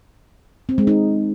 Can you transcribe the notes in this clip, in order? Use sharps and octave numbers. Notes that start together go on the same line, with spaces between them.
C4
G#3
D#4